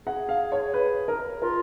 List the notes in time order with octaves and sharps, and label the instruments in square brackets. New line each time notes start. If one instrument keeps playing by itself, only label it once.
[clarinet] G#4 [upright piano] F#5
[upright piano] F5
C#5
B4
A#4
[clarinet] F4 [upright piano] A#4